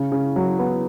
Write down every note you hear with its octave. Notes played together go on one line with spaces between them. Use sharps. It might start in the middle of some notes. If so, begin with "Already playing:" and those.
Already playing: C#3
C#3
F#3
B3